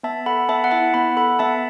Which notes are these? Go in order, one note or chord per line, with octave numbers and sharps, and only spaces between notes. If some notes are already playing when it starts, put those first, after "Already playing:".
B3 E5 A5
A4 F#5 B5
B3 E5 A5
F#5
E4 E5 A5
B3 F#5 B5
A4 F#5 B5
B3 E5 A5